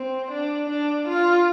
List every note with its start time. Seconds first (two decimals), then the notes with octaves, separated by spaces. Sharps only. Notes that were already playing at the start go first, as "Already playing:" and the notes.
Already playing: C4
0.32 D4
0.69 D4
1.08 F4